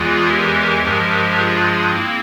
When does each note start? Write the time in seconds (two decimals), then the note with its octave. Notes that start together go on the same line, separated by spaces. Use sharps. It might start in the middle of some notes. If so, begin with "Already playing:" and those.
Already playing: E2 E3 G#3 F4 G#4
0.27 G4 A#4
0.82 G2 F3 G#3
1.36 F4 G#4
1.91 A#3 C4 E4